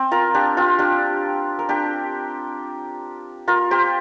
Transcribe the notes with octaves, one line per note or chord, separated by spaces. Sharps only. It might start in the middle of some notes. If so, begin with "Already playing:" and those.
Already playing: C4
F4 A#4
D4 G4
C4 F4
D4 G4
A#4
D4 G4
F4 A#4
G4 C5